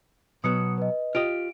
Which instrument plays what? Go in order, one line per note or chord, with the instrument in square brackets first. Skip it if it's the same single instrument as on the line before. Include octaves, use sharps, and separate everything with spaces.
[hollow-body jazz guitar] B2 F#3 B3 [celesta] D#6 C#7
[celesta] B4 D#5
[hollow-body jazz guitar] F4 G4 D#5 [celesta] D7